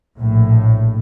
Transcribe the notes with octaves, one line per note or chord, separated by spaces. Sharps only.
A#1 A2